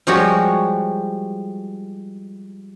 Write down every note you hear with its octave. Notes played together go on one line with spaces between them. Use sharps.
F3 G3 G#3 F#4 G4 C#5